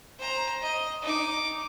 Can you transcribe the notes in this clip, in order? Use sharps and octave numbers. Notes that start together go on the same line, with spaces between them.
C5 A#5
D#5
D#4 D6